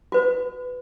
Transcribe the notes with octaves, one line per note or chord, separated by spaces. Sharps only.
F#4 B4